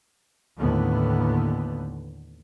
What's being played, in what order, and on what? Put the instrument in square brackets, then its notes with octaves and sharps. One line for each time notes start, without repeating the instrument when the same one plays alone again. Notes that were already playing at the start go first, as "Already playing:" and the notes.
[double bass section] D#2 A2 D3 B3